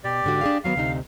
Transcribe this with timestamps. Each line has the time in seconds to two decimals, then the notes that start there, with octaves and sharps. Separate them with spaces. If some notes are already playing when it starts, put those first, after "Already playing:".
0.04 B2 G4 D5
0.24 G#2 D3 F#4
0.41 D4 G#4 F5
0.64 D#3 F#3 B3 F5
0.76 D2 C3 D#4